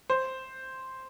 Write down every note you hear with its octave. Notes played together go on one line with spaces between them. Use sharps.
C5